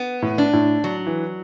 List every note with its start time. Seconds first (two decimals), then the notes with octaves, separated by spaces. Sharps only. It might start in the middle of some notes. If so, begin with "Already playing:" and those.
Already playing: B3
0.22 A2
0.38 D4
0.53 A2
0.84 F#3
1.07 E3